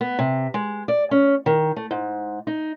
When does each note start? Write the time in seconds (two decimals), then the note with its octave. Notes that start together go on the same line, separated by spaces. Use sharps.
0.01 B3
0.19 C3
0.54 G#3
0.88 D5
1.11 C#4
1.46 D#3
1.76 A3
1.91 G#2
2.47 D#4